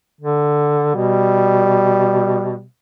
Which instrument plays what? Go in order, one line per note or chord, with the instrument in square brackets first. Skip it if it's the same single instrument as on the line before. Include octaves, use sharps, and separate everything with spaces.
[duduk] D3
[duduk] B2 [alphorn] G3